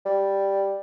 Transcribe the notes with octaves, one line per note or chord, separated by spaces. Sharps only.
G3